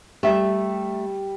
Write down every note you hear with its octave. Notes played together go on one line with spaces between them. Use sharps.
G3 A3 E5